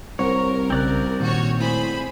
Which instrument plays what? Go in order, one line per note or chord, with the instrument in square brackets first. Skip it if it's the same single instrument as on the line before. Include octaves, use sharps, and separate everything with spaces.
[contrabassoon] C2 [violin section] A#4 [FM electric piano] C5 F#5 [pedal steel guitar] C#5
[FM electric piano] B1 C#3 [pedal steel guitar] C4 D5 F#6
[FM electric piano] A#2 D#3 [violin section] F#4 C#5
[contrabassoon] A2 [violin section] G#4 C5 B5